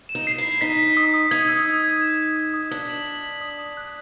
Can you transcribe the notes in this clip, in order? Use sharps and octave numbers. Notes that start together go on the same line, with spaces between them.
E7
D#4
C7
E4
C7
D#4 B6
B6
D#6
D#6
D#4 G#6
E6
B6
G#6
E7
G#6
D#6
D#6
D4 B6
F#7
B6
B6
D#6
D#6
F#6